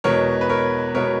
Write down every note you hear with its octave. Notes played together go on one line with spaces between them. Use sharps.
E2 B2 G#3 B3 A#4 C#5
B4
A#4 C#5
B2 G#3 B3 A#4 C#5